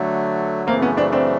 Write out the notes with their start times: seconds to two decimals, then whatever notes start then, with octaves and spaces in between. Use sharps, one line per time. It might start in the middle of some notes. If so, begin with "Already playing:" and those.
Already playing: D3 F#3 A3
0.67 F#2 C#3 E3 A3 A#3 C4
0.82 B3 C#4
0.97 C4 D4
1.12 C4 D4